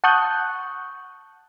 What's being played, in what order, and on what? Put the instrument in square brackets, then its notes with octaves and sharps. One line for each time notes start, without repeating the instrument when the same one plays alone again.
[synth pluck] F#5 A5 C#6 D#6 F#6 G6